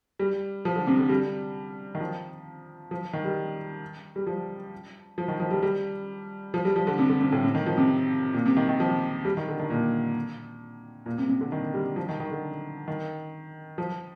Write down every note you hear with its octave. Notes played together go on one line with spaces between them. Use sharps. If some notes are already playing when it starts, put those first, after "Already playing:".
G3
F3
D3
C3
D3
G3
D#3
F3
F3
D#3
G3
G3
F3
F3
D#3
F3
G3
G3
F3
G3
F3
D3
C3
D3
C3
A2
C3
D#3
F3
C3
A#2
C3
D#3
D#3
F3
G3
D#3
D3
D#3
A#2
A#2
C3
C3
D3
D#3
G3
F3
D#3
D#3
D3
D#3
F3